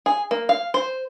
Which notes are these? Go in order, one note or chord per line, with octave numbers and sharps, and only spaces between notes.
G#4
A#3
F5
C5